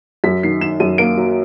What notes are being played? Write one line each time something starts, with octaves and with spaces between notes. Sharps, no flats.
F#2 B6
D#3 C7
D#3 E7
F#2 D#7
A#3 D7
F#3